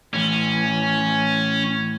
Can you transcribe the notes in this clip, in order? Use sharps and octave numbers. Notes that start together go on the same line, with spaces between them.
A2 E3 C#4